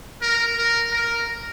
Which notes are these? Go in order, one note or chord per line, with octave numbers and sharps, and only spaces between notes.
A#4
A#4
A#4